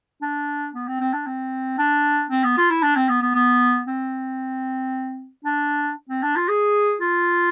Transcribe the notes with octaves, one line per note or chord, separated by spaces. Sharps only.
D4
B3
C4
C4
D4
C4
D4
C4
B3
F4
E4
D4
C4
B3
B3
B3
C4
D4
C4
D4
F4
G#4
F4